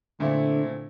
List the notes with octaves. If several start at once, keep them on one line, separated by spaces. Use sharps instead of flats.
A#2 D3 A3 C4 E4